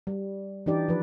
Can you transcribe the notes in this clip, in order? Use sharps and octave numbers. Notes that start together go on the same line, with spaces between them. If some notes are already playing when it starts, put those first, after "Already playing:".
G3
E3 D4 D#4 G4 D5
F3 B4